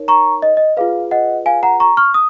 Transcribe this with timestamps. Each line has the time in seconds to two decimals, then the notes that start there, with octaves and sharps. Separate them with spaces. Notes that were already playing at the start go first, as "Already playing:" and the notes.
Already playing: D#4 A#4 C#5
0.08 A#5 C#6
0.42 D#5
0.57 D#5
0.77 F4 G#4 B4 F5
1.11 D#5 F#5
1.46 F5 G#5
1.63 F#5 A#5
1.80 A#5 C#6
1.97 C#6 F6
2.14 D#6